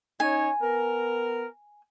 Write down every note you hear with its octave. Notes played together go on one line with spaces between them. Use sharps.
C#4 D#4 C#5 G#5
B3 A#4